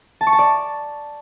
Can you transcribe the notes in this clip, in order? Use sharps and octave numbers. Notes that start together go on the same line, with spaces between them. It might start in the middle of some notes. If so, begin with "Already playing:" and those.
A5
C#6
A5
D5